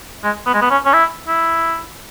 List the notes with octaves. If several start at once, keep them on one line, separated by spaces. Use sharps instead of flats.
G#3
B3
G#3
B3
C#4
C#4
E4
E4